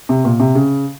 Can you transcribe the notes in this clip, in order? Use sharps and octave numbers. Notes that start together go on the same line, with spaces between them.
C3
A#2
C3
C#3